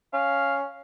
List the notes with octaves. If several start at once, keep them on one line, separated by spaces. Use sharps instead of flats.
C#4 F5